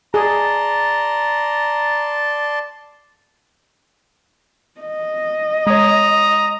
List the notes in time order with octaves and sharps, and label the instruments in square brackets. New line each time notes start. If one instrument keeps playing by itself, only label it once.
[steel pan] G#4 [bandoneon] D5 A5 C6 [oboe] A#5
[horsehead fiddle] D#5
[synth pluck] G#3 C#5 [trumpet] A#5 [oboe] D#6